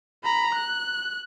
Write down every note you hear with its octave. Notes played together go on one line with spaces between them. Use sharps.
A#5 B5
F#6